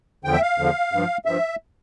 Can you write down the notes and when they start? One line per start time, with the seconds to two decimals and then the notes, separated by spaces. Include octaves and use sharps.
0.24 E2 D3 F3 G5
0.33 E5
0.42 F5
0.58 E2 D3 F3
0.92 G2 F3
1.25 G2 F3 E5